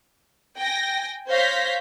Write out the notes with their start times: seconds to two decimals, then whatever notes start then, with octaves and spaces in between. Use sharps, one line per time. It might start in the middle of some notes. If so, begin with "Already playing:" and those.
0.58 G5 G#5 A#6
1.29 C5 C#5 F5 G6 A#6 B6